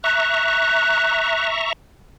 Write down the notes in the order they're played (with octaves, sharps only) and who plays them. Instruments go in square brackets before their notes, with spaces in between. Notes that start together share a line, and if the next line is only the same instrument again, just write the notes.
[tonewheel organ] E5 A#5 C#6 [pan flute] F#6